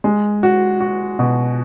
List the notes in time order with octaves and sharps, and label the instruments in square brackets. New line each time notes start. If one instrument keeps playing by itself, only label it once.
[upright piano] G#3
F#4
F#4
B2